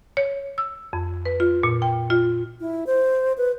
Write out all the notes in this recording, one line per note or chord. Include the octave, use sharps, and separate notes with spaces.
C#5
E6
F2
B4
F4
A#2
G5
F4
E4
C5
B4